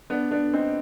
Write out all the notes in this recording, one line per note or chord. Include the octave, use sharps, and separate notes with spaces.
B3 D4
B3 D4
C4 D#4